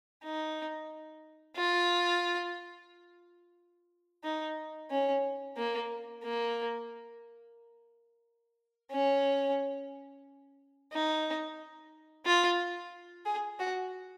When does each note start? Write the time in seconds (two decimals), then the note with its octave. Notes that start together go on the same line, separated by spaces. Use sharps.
0.24 D#4
1.57 F4
4.24 D#4
4.91 C#4
5.57 A#3
6.24 A#3
8.91 C#4
10.93 D#4
12.26 F4
13.26 G#4
13.59 F#4